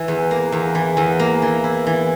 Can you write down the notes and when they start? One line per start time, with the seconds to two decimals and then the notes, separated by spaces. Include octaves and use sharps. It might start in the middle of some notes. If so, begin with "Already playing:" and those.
Already playing: E3
0.08 E2
0.31 A#3
0.52 E2
0.75 E3
0.97 E2
1.19 A#3
1.42 E3
1.64 E4
1.87 E3